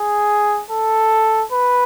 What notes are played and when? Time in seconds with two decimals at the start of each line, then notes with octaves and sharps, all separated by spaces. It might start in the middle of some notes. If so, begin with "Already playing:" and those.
Already playing: G#4
0.71 A4
1.52 B4